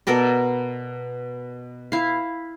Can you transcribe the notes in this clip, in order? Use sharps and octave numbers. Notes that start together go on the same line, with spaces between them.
B2 A4 A#4 D5
E4 F5